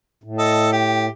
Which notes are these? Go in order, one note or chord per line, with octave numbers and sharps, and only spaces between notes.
A2
A4 D#5
G4